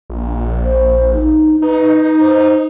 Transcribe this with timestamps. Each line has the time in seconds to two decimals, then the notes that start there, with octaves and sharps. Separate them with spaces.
0.10 A#1
0.64 C5
1.14 D#4
1.62 D#4 B4
1.95 D#4
2.20 C5